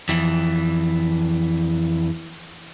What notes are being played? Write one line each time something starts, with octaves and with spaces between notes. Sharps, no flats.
F2 E3